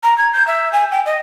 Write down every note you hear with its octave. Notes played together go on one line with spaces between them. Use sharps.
A#5
G#6
G6
E5
G#5
G5
D#5